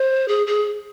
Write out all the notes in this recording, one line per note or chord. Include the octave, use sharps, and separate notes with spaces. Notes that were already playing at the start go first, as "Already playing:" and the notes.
Already playing: C5
G#4
G#4